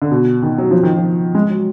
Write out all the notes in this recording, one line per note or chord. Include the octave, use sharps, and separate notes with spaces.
D3
B2
D#3
F#3
F3
D#3
F3
G#3
F#3